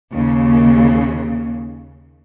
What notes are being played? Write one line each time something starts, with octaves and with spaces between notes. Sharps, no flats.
D#2 C#3